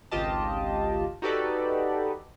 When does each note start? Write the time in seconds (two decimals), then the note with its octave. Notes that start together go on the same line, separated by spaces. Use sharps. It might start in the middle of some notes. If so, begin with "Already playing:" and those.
0.11 G#1 C#2 F4 G4 D#5 A5
1.22 D#4 F#4 G4 A4 B4 D5